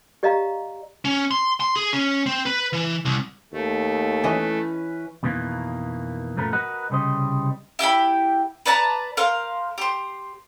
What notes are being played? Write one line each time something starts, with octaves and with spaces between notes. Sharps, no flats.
G4 D5 D#5 F5 A#5
C#4
C6
C6
G#4
C#4
C4
B4
E3
C2
D#2 A3
E3 C#4 E4 B4 D#5
F2 B2 D#3 E3 A#3
F#2 A#2 F3 A3 A#4 B4
F#4 A#4 B4 D#5 F#5
C2 C#3 G3 C5 D#5
E4 G4 G5 B5
B4 D5 A5 A#5
A#4 C5 F5
G4 C5